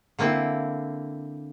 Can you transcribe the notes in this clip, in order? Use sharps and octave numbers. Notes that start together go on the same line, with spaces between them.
D3 A#3 C4 E4